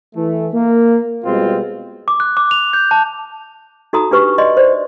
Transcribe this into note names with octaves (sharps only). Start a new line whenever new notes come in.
E3 A3
A#3
B2 G3 G#3 C4 F4
D6
F#6
D6
F7
G6
A5
D#4 F#4 A4 A#5 B5 D#6
D4 G4 B4 C#6
D5 D#5 C6
C5 D5